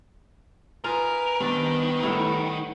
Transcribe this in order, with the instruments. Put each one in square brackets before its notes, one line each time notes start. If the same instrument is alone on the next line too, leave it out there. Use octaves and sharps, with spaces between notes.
[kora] D#4 F4 F5 [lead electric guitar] A#4 [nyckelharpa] B4 [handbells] G#5
[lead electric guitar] D#3 [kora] G3 C4 D4 [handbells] B3
[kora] A2 G3 E4 [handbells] F#5